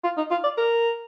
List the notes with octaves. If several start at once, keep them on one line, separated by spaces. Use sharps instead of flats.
F4
D#4
F4
D5
A#4